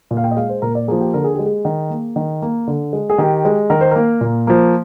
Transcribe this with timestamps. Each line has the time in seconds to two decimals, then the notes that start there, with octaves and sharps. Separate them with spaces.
0.11 A#2
0.17 F5
0.24 G5
0.31 D#5
0.37 G#3 F5
0.49 C5
0.62 A#2 A#4
0.75 D5
0.88 F3 A#3 G#4
1.01 G4
1.14 D3 A#4
1.24 G#4
1.35 G#3 G4
1.46 G#4
1.65 D#3
1.90 A#3
2.16 D#3
2.42 A#3
2.67 D3
2.93 G#3
3.10 G#4
3.18 D#3 G4
3.45 G#3
3.70 D#3 A#4
3.81 C5
3.91 A#3 A#4
4.21 A#2
4.47 F3 A#3